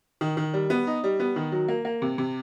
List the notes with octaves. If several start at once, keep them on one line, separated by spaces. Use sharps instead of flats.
D#3
D#3
G3
B3
D#4
G3
B3
D#3
F#3
A#3
A#3
C3
C3